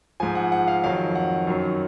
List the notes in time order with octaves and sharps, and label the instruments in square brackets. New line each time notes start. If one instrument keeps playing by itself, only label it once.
[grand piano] G#2 F3 G#5
F#5
F#5
F5
F2 D#3 F#3 F5
F#5
F#2 D#3 F#3